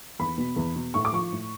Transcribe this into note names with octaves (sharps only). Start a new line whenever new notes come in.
E2 B5
B2
E2
B2
A2 C#6
D6
F3 C#6
A2